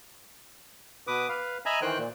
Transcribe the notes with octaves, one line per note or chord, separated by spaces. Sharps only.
B2 B4 D6 D#6
B4 F5
D#5 E5 G#5 A#5 B5
D#3 E3 C5 G5 F#6
A#2